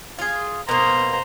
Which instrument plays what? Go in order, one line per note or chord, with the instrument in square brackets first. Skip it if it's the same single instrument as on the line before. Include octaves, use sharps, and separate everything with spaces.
[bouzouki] F4 G#4
[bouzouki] B2 A#3 [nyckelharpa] C5 A#5